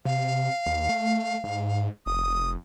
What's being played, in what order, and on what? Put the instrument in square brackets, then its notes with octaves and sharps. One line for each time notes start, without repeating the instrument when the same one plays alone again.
[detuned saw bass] C3 [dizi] F5
[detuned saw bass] D#2
A3
G#2
[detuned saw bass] F1 [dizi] D#6